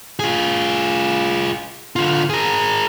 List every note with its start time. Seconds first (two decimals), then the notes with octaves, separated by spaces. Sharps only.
0.19 F4 G#4
1.96 D3 F4
2.30 G#4 A#4